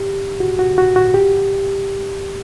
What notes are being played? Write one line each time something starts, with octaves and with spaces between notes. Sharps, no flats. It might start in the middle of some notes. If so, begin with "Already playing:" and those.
Already playing: G4
F#4
F#4
F#4
F#4
G4